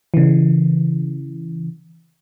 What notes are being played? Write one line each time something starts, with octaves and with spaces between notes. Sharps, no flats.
C#3 E3